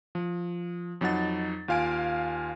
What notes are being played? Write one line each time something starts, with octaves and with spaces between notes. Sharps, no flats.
F3
F2 F#3 D#4 F#5 A6
D#2 F4 F5 G#5 D7